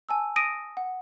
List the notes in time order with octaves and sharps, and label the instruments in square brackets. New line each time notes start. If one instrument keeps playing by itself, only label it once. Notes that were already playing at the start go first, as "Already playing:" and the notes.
[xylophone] G#5 A5 E6
D#6 A#6 D7 D#7
F#5